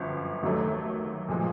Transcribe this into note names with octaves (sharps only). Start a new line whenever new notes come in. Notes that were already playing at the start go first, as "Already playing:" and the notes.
Already playing: G1 F#2 F3
D#2 D#3 F#3 A3
A#2 F3 G#3